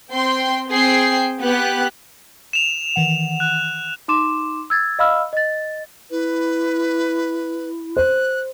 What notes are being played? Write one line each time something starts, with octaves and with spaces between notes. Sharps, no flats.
C4 G5 C6
C4 G#4 G5 C7
B3 G4 F#6
E7 F7
D#3 E3 F#5
F#6
D#4 C6 D6 E7
E6 G#6 A6
D#5 F5 B5 E6 F6
D#5 A6
E4 B4
C5 F#6